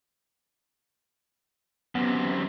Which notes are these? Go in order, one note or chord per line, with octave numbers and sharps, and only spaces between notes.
F#2 C3 B3